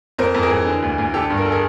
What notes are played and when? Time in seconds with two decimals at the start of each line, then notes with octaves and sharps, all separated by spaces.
0.18 F2 A#4 C5
0.34 F2
0.43 G#4 A#4
0.50 E3
0.66 D3
0.82 D2
0.98 D2
1.14 D3 G4 A4
1.30 G2
1.38 A#4
1.45 A4
1.52 G#4 A#4